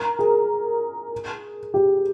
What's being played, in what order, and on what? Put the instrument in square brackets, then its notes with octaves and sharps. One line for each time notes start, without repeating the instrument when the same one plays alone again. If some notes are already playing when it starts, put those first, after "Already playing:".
Already playing: [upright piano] A#4
G#4
G4